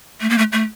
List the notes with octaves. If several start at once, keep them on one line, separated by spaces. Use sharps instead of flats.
A3
A#3
A3
A3